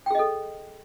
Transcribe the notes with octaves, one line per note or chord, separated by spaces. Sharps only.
G#4 A4 D#5 G5